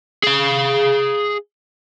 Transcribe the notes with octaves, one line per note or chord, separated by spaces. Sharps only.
G#4 F5